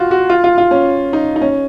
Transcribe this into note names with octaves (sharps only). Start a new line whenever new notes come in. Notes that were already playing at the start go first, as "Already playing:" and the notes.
Already playing: F4 F#4
F#4
F4
F4
F4
C#4
D#4
D#4
C#4